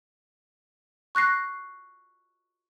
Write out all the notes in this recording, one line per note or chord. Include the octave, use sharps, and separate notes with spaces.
C#6 F#6 A#6 C7